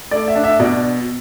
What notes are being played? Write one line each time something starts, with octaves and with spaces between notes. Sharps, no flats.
A3 D5
E5
D4
E5
B2 D5